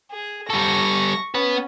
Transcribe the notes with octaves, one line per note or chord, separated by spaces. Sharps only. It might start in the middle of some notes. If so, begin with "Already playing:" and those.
G#4
G3 A4 C#6 A#6
B3 C#4 B4